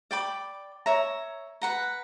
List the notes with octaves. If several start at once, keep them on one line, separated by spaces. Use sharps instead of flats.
D5 G5 B5 D6
C#5 E5 A#5
B4 F#5 A#5